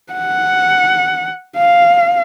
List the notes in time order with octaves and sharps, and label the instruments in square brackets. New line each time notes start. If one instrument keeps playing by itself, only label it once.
[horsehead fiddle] F#5
F5